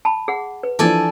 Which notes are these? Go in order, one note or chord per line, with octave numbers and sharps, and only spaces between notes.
A5 B5
G#4 F#5
B4
E3 F3 D4 A4 D5 G#5